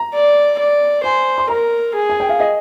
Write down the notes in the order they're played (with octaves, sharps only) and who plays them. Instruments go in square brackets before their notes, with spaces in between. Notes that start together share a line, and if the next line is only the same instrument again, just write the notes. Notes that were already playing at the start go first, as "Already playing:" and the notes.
Already playing: [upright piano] A#5
[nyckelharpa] D5
D5
[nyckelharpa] C5 [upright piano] G#5
[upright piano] C6
[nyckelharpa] A#4 [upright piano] A#5
[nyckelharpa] G#4
[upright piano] G#5
G5
F5
D#5